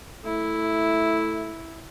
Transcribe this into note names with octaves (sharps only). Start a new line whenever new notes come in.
A3 E4